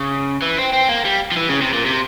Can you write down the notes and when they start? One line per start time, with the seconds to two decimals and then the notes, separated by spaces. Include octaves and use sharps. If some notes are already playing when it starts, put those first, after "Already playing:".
Already playing: C#3
0.42 E3
0.58 C4
0.73 C4
0.89 A#3
1.05 G3
1.32 F3
1.37 E3
1.49 C#3
1.61 C3
1.73 A#2
1.86 C3